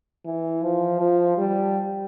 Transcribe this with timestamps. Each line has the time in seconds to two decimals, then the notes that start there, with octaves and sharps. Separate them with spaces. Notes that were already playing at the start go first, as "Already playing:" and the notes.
0.25 E3
0.63 F3
1.00 F3
1.38 G3